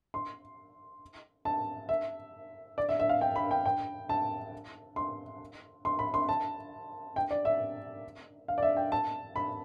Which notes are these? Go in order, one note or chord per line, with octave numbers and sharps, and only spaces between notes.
C6
A5
E5
D5
E5
E5
F5
G5
B5
G5
G5
A5
C6
C6
B5
C6
A5
G5
D5
E5
F5
D5
E5
G5
A5
B5